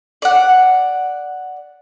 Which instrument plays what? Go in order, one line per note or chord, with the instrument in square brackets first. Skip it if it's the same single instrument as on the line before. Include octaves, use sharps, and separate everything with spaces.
[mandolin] D5 F#5